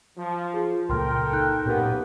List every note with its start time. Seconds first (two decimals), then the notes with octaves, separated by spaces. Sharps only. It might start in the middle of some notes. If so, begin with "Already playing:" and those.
0.18 F3
0.54 F4 G#4
0.90 C#2 A#2 A#3 A4 A#4 G5 C6 F6
1.33 D#4 F#6 G6
1.66 F#2 A#2 A#3 B3 G4 A#4 F#5